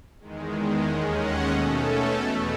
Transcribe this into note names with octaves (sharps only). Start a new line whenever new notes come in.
E2 D#3 G#3
D#2 D#3 G#3 C#4 D#5 F#5
D#5 F#5
B2 A3 C#4 A4
A4
E2 B2 A3 A4